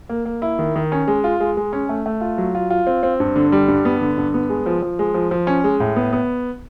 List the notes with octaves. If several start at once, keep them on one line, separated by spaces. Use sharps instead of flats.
A#3
A#3
E4
D#3
D#3
C#4
G#3
F4
G#3
G#3
C#4
A3
A3
F4
F#3
F4
F4
C4
C4
G2
D3
G3
G2
B3
D3
G2
B3
G#3
F3
F3
G#3
F3
F3
C#4
G#3
A2
B3
B3